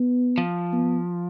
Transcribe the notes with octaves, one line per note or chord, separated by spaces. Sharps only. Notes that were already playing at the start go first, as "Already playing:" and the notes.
Already playing: B3
F3
B3